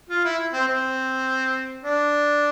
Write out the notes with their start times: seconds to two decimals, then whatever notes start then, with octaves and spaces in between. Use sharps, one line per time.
0.10 F4
0.25 E4
0.54 C4
0.67 C4
1.84 D4